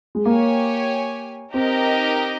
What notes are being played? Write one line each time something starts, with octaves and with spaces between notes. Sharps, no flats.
G#3
A#3 G4 C#5 G#5
C4 D#4 G4 A#4 D#5